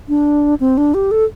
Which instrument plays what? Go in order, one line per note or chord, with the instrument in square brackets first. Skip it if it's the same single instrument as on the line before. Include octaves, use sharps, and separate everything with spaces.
[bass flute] D4
C4
D4
G4
A4